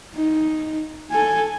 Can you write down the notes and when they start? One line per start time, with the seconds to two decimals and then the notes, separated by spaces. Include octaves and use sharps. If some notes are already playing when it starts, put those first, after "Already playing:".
0.15 D#4
1.11 A4 G#5